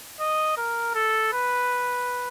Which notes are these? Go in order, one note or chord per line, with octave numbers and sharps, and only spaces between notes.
D#5
A#4
A4
B4